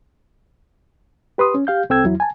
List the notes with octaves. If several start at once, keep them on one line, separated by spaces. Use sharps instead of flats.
G4 B4 C6 D#6
C#4
G4 F5 G6
C2 C4 A4 G5 E6 G#6
E2 F#3 E4
G#5 A5